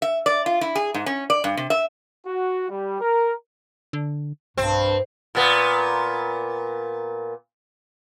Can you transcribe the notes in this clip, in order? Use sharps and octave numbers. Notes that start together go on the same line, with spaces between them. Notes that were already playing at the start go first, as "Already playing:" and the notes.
E5
D5
F4
E4
G#4
G#2
C#4
D5
G2
C3
E5
F#4
G3
A#4
D3
B1 G2 C4
A#2 B3